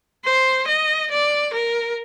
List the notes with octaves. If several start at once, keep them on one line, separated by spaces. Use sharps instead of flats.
C5
D#5
D5
A#4